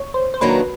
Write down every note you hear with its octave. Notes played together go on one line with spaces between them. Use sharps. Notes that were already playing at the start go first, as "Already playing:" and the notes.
Already playing: C#5
C5
C5
D#3 F#3 A#3 D4 F#4 B4